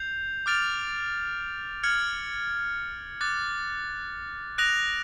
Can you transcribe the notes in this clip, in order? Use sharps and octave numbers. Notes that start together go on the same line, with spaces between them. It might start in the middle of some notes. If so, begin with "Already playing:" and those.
Already playing: G6 C7 F7
D6 F6 A6 D7 F7
F6 G#6 C#7 F#7
D6 F#6 A6
D#6 F#6 A#6 D7 F7